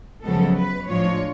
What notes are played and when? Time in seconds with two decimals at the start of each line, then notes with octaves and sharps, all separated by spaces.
0.23 F#2 C#3 F3 G#3 B3 A4
0.55 B4
0.87 A2 F3 G#3 D4 F4 C#5